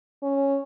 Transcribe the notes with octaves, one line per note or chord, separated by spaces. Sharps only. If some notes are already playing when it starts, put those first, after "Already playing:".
C#4